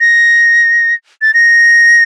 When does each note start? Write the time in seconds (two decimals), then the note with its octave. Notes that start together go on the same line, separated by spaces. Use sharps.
0.01 A#6
1.22 A6
1.34 A#6